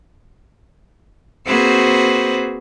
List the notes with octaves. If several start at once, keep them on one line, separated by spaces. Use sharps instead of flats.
A#3 C4 F#4 G#4 B4 C5